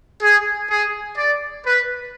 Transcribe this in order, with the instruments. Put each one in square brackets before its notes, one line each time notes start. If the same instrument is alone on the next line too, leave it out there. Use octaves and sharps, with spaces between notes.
[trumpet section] G#4
G#4
D5
B4